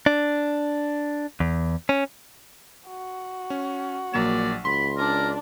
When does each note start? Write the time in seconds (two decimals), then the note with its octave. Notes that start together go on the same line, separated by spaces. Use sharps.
0.06 D4
1.40 E2
1.89 C#4
2.87 F#4
3.50 C#4
4.14 A#1 F#3 A#3 D5 E7
4.65 C#2 B5 C6
4.98 D4 A#4 D5